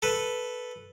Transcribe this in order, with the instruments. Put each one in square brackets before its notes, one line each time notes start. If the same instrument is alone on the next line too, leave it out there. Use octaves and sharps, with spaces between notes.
[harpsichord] A4 B4